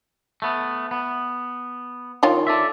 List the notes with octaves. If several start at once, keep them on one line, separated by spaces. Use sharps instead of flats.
A3 B3
B3
D#3 F4 C#5
A4 D5 E5